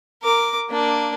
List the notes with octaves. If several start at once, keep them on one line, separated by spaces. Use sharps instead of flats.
A#4 D6
A#3 D4